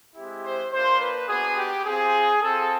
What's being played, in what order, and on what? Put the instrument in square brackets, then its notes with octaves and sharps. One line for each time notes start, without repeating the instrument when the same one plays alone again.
[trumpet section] G#3 C4 E4 G4
C5
A#3 D4 F4 C5
B4
B3 D4 F#4 G#4
G4
C4 F4 G#4
C4 F4 A4